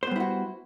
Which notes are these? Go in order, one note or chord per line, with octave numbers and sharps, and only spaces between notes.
G3 B3 E4 F#4 C5